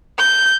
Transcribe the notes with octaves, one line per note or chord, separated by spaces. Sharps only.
G6